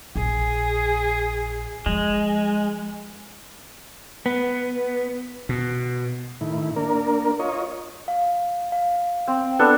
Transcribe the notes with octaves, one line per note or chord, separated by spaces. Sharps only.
A#1 G#4
F3 G#3
B3
B2
A2 D#3 E4
A#3 D4 A#4
F4 C#5 D#5
F5
F5
C4
B3 D4 A4 B4